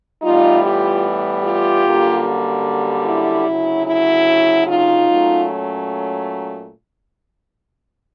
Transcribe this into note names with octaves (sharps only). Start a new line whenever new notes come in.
A2 E3 G3 B3 D#4 F4
F4 G4
F4 G4
F#2 D3 G3 A#3
E4
D2 C#3 F#3
E4
D#4 F4
A#2 F#3 A3 C#4